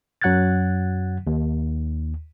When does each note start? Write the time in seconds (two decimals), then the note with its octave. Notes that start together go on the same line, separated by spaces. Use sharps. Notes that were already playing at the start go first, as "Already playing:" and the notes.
0.22 F#2 F#3 F#5 F#6 G#6 A6
1.27 D#2